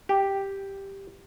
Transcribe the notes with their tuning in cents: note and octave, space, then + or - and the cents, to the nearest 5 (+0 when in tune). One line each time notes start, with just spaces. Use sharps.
G4 +0